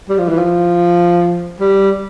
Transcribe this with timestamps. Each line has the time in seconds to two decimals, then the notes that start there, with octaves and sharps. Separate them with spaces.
0.09 G3
0.19 F3
0.28 E3
0.38 F3
1.60 G3